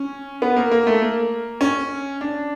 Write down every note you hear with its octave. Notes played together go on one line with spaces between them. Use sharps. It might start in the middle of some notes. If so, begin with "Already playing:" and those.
Already playing: C#4
B3
A#3
A#3
A3
A#3
C#4
D4